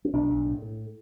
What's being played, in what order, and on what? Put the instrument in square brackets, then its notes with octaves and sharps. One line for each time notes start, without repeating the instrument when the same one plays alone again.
[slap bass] C#4
B1 D4
B1
A2
A2